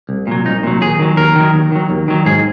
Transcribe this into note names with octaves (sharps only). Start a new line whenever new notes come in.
C2
A#2 F#3
C2 D#4
A#2 F#3
D#2 G#4
D#3 F#3
D#2 A#4
D#3 F#3
D#2
D#3 F#3
D#2
D#3 F#3
G#2 G#4